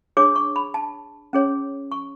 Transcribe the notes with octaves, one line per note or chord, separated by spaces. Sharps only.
D4 G#4 C#5 D6
C#6
B5
A5
C#4 G#4 C#5
C#6